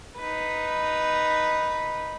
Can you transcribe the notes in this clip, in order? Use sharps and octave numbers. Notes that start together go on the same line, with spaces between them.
D#4 B4